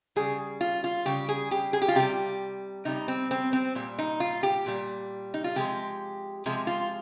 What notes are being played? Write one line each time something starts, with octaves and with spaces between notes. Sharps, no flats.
C#3 G3 G#4
F4
F4
C#3 G3 G4
G#4
G4
G#4
G4
F4
C3 G3 G4
C3 G3 D#4
C4
C4
C4
A#2 G3
D#4
F4
G4
A#2 G3
D#4
F4
C3 F3 G#3 G4
C3 F3 G#3
F4